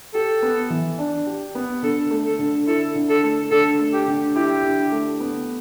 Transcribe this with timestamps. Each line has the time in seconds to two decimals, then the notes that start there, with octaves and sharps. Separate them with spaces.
0.14 G4 A4
0.42 B3
0.70 E3
0.98 D4
1.27 G4
1.55 B3
1.82 D3 A4
2.11 A3
2.25 A4
2.39 D3
2.67 E4 A4
2.95 D3
3.09 A4
3.23 A3
3.51 D3 A4
3.79 A3
3.93 G4
4.07 D3
4.36 E4 G4
4.63 D3
4.92 A3
5.20 B3